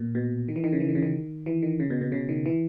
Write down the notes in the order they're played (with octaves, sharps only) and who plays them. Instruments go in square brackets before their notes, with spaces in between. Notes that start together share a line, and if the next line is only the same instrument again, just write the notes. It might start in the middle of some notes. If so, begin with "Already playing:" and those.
Already playing: [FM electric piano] A#2
B2
D#3
E3
D#3
C#3
E3
D#3
C#3
D#3
E3
D#3
C#3
B2
B2
C#3
D#3
E3